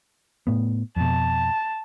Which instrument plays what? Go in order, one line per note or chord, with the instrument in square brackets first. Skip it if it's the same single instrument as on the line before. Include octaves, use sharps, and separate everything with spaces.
[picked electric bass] A2 B3
[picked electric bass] F2 B2 [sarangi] A5